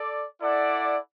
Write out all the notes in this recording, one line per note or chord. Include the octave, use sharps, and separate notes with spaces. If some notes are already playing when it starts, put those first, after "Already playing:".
Already playing: A4 D5
E4 A4 D5 F#5